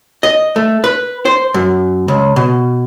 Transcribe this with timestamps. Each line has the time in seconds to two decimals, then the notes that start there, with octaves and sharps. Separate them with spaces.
0.23 D#5
0.56 A3
0.84 B4
1.25 C5
1.54 F#2
2.08 C#2
2.36 B2